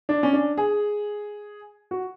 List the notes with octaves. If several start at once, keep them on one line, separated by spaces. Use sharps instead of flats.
D4
C#4
D4
G#4
F#4